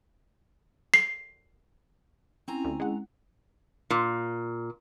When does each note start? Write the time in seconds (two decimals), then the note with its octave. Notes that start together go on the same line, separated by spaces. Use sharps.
0.94 C7
2.48 C4 C#4 E4 G#5 A#5
2.65 D2
2.80 G#3 F#5
3.90 A#2